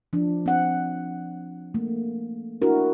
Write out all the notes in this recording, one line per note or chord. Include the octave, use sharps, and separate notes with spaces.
F3 D4
C4 F#5
A3 A#3
D4 E4 F#4 A#4